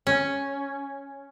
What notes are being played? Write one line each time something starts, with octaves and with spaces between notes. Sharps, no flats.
C#4